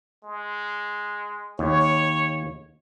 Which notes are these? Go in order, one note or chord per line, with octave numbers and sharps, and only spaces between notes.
G#3
D#2 C#5